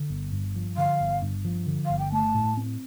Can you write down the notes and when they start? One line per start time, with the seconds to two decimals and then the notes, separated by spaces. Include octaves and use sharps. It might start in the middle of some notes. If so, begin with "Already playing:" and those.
Already playing: D3
0.10 G1
0.32 G2
0.55 F3
0.77 D3 F5
1.00 G1
1.22 G2
1.45 F3
1.67 D3
1.85 G1 F5
1.99 G5
2.12 A3 A5
2.34 A2
2.57 C4